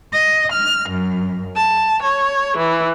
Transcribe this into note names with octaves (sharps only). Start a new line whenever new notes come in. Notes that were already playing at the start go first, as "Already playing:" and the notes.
D#5
F6
F#2
A5
C#5
E3